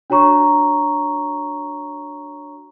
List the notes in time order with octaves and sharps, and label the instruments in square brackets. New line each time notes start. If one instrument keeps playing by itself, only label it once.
[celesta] D4 F#4 C#5 A#5 C#6